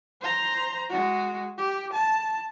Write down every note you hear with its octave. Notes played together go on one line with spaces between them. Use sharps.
C5 A#5
G#3 F#4
G4
A5